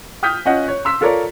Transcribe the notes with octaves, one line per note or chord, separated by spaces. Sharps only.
G5 D#6 F6 G6 B6
C#4 F4 D#5 F#5 F#6
C#5
C6 E6 B6
F4 A4 A#4 C#5 D5